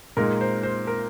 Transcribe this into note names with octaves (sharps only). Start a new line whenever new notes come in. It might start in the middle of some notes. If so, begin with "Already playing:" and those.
A#2 G#3 D#4 A#4
C5
C5
A#4